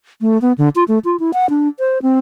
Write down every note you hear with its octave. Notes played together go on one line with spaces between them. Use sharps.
A3
B3
D3
F4
A3
F4
E4
F#5
D4
C5
C4